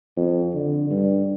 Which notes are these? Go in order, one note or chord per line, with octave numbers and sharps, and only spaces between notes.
F2
D3
G2